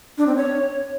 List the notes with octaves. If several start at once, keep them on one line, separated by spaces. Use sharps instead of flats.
D4
C4
C#5